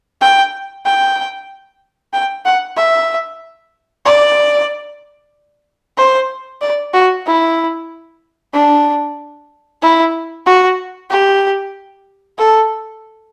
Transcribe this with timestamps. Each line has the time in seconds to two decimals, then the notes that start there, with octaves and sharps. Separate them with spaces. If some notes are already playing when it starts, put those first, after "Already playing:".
0.21 G5
0.85 G5
2.13 G5
2.46 F#5
2.77 E5
4.05 D5
5.97 C5
6.62 D5
6.94 F#4
7.26 E4
8.54 D4
9.82 E4
10.46 F#4
11.10 G4
12.38 A4